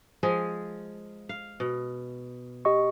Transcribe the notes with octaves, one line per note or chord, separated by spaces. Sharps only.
F3 G#3 G#4
F5
B2
G4 D#5 C#6